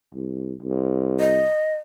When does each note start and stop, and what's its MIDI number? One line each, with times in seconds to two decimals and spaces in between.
0.14 0.53 36
0.62 1.44 36
1.20 1.75 75